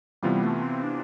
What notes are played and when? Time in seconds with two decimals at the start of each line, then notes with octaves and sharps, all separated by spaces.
0.22 C3 E3 G3 B3 F4
0.43 A3
0.63 C4
0.83 D4